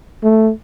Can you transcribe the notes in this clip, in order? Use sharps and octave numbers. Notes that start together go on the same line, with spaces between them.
A3